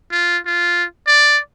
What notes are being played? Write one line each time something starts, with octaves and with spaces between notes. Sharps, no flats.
F4
F4
D5